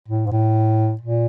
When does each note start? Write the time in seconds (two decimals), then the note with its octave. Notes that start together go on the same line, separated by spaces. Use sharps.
0.08 A2
0.27 G#2
0.32 A2
1.01 A#2